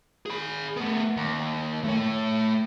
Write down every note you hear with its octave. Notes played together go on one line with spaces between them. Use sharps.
G#4 B5
A3 B3
D#2
A3 C#5